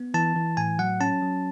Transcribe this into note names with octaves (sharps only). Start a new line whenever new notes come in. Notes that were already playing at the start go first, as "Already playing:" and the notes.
Already playing: B3
E3 A5
E3
A2 G#5
F#3 F#5
C#4 A5
F#3